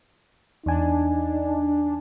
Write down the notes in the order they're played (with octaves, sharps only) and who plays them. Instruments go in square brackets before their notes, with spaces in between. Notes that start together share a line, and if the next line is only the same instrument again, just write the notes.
[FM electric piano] E2 G#5 [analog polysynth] D4 [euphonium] D#4